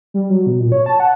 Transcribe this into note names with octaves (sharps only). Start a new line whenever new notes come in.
G3
F#3
B2
A#2
C#5
A5
F#5